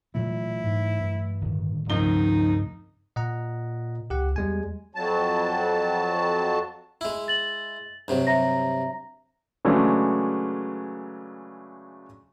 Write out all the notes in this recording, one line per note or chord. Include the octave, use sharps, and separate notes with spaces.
A#2 E3 F#3 A3 E4
G#2
G2
D1 D2 D#3
C#2 G2 D#3 F3 A3 C4 D#4 G7
A#2 D#5 F#5 A#5
C#2 G4 F#5
E2 G3 G#3 G#5
F2 F#3 A5
G#3 E4
A6 F#7
G2 C3 F#3
E5 A#5 A#6
C#3 E3 F#3 G#3 A3 D4